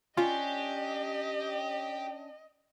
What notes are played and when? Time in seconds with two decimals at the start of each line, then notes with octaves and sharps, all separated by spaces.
0.17 C#4 D4 F4 G4 D#5